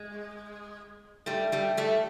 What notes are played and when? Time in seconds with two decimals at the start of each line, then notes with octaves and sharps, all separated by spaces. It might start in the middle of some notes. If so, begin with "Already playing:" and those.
Already playing: G#3
1.26 G3 A3
1.52 G3 A3
1.77 G3 A3